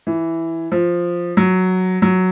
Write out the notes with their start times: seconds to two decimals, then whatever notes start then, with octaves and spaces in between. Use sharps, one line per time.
0.07 E3
0.72 F3
1.37 F#3
2.02 F#3